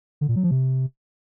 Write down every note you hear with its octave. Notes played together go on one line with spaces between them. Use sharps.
D3
A#2
F#3
F3
C3